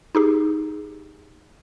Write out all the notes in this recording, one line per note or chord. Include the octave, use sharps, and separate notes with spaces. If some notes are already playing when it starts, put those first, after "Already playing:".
D#4 G4 G#4